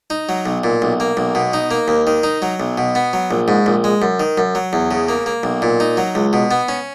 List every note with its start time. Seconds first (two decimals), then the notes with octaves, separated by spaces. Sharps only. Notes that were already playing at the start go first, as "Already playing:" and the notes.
0.10 D#4
0.29 F#3
0.46 B1
0.64 A#2
0.82 B1
1.00 A#3
1.17 B1
1.35 B2
1.53 D#4
1.71 A#3
1.88 D#2
2.07 D#3
2.23 D#4
2.42 F#3
2.60 B1
2.78 B2
2.95 B3
3.13 F#3
3.31 A#1
3.48 G#2
3.66 A#1
3.84 G#3
4.02 F#2
4.20 D#3
4.38 F#2
4.55 F#3
4.73 E2
4.91 C#3
5.09 A#3
5.26 A#3
5.43 B1
5.62 A#2
5.80 D#4
5.97 F#3
6.15 C#2
6.33 B2
6.51 B3
6.69 C#4